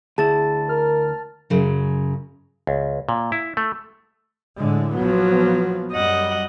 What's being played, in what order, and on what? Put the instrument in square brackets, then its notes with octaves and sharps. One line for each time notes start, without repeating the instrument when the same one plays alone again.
[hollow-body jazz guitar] D2 E4 [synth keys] G#4 [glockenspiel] A5 A6
[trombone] A#4 [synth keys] F6
[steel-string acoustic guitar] F#2 C#3 F#3
[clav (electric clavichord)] C#2
A#2
E4
A3
[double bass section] A2 D3 G#3
[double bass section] A#1 F3 B3 [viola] F#3
[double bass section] F#2 G3 [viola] D#5 F#5